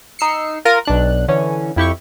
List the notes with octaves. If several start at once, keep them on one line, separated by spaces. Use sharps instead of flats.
D#4 E6 C7 C#7
F4 A#4 D#7
B1 D4 F#6
D3 E3 C#4
F2 E4 G4 C#6